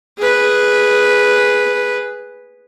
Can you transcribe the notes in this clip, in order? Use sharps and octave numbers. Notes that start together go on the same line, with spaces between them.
G#4 B4